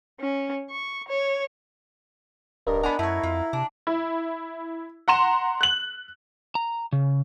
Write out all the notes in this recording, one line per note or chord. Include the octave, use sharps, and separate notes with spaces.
C#4
C#6
C#5
D1 G2 A#4 D#5
B3 D4 F#5 G#5 A#5 B5
F#2 A3 E4 C#5 A#5
F2 F4
C3 D4
E4
F#5 A#5 C6 E7
F#6 F#7
A#5
C#3